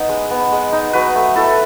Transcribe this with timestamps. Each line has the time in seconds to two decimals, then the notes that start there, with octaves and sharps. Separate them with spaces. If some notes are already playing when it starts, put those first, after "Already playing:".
Already playing: B3 D#4
0.09 G#3
0.31 B3
0.52 G#3
0.73 D#4
0.93 F#3 B4
1.15 A3
1.35 E4 A4